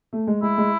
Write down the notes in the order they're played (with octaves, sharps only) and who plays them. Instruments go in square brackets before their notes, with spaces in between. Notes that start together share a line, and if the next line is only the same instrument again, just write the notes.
[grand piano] A3
G#3
[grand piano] G#3 [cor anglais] E4
[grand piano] G#3